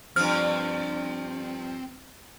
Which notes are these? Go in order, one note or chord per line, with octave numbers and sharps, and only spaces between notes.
G2 F3 C4 F6